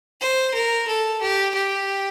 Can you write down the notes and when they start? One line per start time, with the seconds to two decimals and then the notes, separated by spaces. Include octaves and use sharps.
0.21 C5
0.54 A#4
0.87 A4
1.21 G4
1.54 G4